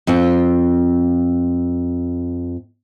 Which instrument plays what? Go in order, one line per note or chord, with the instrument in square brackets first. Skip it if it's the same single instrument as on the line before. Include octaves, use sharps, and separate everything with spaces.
[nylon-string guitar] F2 C4 F4